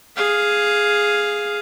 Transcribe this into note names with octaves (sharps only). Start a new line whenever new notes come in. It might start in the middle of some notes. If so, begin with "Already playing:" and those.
G#4 F5